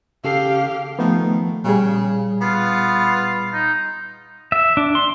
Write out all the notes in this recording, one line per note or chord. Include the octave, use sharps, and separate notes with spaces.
C#3 G4 A4 F5 C7
D#3 F3 A3 B3
A#2 C#3 G3 G#4
B3 F4
D#4
E5
D4
C6